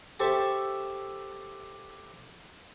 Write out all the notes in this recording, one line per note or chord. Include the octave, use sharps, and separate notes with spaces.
G4 A4 C5 E5 A5 C#6